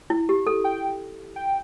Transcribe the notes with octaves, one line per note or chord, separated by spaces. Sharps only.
E4
G4
A4
G5
G5